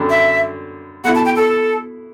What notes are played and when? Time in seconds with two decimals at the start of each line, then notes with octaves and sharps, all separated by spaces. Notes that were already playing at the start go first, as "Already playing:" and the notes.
Already playing: F#2 D3 G3 D4
0.10 E5
1.04 B2 A3 E4 F#5
1.15 A5
1.25 G5
1.36 A4